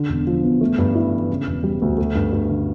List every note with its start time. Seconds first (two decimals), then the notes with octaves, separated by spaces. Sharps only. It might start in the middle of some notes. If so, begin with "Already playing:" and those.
Already playing: D3
0.09 E1
0.27 F3
0.43 E2
0.61 A3
0.78 G2
0.95 E4
1.12 E3
1.30 C#3
1.47 E1
1.64 G3
1.82 D2
1.98 A3
2.15 G2
2.33 G2
2.50 D3